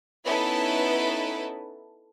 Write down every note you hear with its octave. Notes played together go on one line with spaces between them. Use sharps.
B3 C#4 D#4 E4 A4 B4